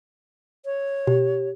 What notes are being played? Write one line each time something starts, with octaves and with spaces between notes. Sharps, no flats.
C#5
B2 G4